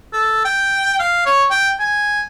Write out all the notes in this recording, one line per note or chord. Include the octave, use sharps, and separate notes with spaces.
A4
G5
F5
C#5
G5
G#5